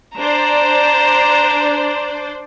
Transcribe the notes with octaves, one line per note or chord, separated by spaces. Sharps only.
D4 C5 D5 A#5 E7